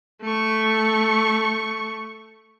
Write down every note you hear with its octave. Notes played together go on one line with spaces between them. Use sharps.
A3 C#6